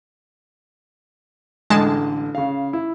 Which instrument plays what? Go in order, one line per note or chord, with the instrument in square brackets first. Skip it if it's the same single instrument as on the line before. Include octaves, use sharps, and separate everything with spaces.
[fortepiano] A1 D3 [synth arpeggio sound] G#3 A5
[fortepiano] C#3 F5
E4